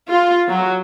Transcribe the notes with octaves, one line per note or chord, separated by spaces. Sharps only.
F4
F#3